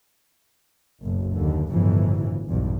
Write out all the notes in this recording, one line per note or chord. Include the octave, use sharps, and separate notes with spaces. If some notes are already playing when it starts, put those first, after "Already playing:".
F#1 B1
D#2 D3
G1 D2 A2 C#3 E3 F3
B1 E2 G2